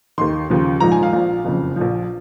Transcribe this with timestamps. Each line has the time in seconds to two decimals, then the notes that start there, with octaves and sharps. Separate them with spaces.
0.18 D#2 D#3 C6
0.50 D#2 C#3 F3
0.80 A#1 G#2 F3 A#5
0.92 G#5
1.03 F5
1.13 A#1 A#2 F3
1.45 F#1 F2 C#3
1.76 A#1 A#2 F3